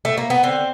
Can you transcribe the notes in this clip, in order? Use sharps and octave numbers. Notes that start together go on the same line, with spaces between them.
A3
A#3
B3
D3 C4